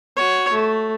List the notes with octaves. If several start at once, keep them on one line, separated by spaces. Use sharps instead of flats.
F#4 C#5
A3